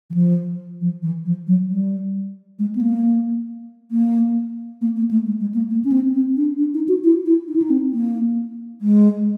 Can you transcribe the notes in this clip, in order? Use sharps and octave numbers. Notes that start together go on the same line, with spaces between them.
E3
F3
F3
E3
F3
F#3
G3
G#3
B3
A#3
A#3
A#3
A#3
A3
G#3
G#3
A#3
A#3
C#4
C4
C4
D4
D4
D#4
F#4
E4
E4
D#4
E4
D#4
C4
A#3
G#3